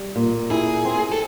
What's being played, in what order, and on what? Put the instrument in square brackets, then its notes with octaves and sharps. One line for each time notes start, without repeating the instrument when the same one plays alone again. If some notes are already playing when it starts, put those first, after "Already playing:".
Already playing: [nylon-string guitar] G3
A#2
[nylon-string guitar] E4 [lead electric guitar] G#4
[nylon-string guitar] C4
[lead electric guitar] A4